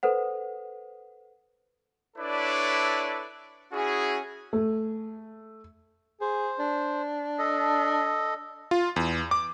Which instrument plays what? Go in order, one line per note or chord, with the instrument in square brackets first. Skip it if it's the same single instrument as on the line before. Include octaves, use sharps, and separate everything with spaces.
[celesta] A4 B4 C5 F#5
[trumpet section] D4 E4 A4 B4 C#5 D5
C#4 E4 F#4 G#4
[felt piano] A3
[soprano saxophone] G#4 [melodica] C5
[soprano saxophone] D4
[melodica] A4 D#5
[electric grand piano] F4
E2
D6